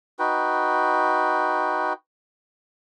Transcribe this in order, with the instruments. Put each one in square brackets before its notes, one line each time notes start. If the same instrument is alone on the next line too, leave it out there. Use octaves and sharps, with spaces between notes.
[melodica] D#4 F#4 B4 G5